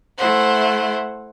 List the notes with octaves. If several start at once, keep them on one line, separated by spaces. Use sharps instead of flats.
A3 E4 C5 F#5